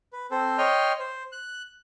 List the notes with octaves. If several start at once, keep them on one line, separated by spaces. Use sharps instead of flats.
B4
C4 A4 C5
C#5 D#5 G5 C6 F6
C5
F#6